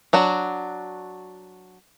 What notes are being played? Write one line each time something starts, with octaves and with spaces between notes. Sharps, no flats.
F#3 D4 F#4